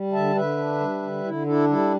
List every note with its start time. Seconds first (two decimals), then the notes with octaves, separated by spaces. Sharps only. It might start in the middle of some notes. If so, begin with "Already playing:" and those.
Already playing: G3
0.12 D3 E5 A5
0.35 D3 B4 E5
0.58 D4
0.80 G3
1.02 D3
1.24 D3 E4
1.46 D4 E4 A4
1.69 G3 E4 A4